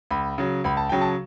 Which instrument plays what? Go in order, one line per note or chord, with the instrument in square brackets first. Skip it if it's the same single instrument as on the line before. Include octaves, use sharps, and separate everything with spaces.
[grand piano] C#2 B5
C#3 F#3
C#2 B5
A5
C#3 F#3 G5
A5